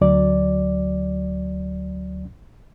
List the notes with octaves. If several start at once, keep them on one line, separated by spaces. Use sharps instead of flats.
D2 F#3 D5